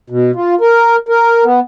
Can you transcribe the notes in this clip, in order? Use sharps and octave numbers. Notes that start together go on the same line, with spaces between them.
B2
F4
A#4
A#4
B3